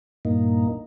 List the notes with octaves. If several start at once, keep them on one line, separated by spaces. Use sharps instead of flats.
G2 A#2 A#3 D#4